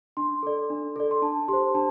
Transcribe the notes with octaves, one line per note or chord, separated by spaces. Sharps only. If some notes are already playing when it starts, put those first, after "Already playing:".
D4 C6
A4 D5
D4
A4 D5
C6
D4 A5
G4 C5 C6
D4 A5